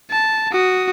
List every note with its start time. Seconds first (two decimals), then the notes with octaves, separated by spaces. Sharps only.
0.11 A5
0.52 F#4 D#6